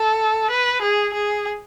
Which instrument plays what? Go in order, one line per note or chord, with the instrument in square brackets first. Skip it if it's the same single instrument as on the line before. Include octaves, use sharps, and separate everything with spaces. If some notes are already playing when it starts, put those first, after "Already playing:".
Already playing: [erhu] A4
B4
G#4
G#4